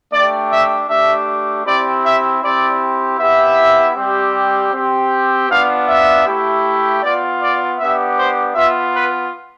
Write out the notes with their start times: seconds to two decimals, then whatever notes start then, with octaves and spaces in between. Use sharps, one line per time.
0.12 A3 D4 G4 D5
0.51 E5
0.89 A3 D4 G4 E5
1.65 C4 E4 G4 D5
2.04 E5
2.42 C4 E4 G4 D5
3.19 B3 E4 G4 E5
3.95 G3 C4 G4
4.72 C4 G4
5.48 B3 D4 F4 F5
5.87 E5
6.26 A3 E4 G4
7.02 B3 F4 D5
7.41 D5
7.79 B3 D4 G4 E5
8.17 C5
8.55 B3 F4 E5
8.94 B4